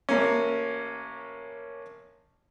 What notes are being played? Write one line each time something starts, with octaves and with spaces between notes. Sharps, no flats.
A1 A#3 C#4